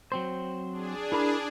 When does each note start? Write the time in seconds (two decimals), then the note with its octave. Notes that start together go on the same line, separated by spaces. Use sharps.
0.12 F#3 C4 C5
0.72 D4 G#4
1.12 E4 A#4 B5